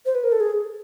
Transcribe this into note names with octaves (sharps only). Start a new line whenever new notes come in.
C5
B4
A#4
A4
G#4